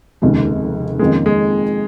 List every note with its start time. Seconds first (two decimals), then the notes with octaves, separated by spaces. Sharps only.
0.22 F1 D#2 C#3 G#3
0.99 F2 D#3 G#3 A#3 C#4
1.26 G#3